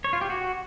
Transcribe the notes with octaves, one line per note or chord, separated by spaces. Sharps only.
C#5
F4
G4
F#4